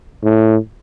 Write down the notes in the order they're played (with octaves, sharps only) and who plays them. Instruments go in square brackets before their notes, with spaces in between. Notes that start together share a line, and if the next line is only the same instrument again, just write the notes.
[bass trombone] A2